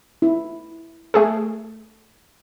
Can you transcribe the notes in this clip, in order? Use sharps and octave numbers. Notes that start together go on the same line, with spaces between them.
E4
A3 G#4 A4